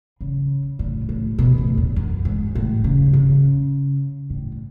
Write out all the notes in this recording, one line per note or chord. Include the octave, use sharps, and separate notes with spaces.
C#3
A2
A2
B2
A2
E2
F#2
G#2
A2
C#3
C#3
A2